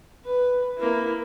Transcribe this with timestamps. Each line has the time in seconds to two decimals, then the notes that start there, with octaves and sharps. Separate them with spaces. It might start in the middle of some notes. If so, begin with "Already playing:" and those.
0.24 B4
0.78 A#3 E4